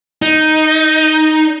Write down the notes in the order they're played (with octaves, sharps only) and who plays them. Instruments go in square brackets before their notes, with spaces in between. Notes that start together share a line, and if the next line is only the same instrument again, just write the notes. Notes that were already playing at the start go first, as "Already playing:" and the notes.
[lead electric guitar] D#4